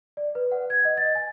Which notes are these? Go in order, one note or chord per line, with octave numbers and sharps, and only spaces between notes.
D5
B4
F#5
G#6
D#5
A6
G#5